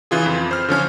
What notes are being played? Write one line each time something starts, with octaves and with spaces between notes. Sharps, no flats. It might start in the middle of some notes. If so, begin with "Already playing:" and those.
C#3 E3 F4 G#4
F2
C5 F6
D3 F3 C#4 F6